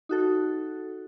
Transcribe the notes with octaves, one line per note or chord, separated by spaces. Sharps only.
D#4 F#4 A4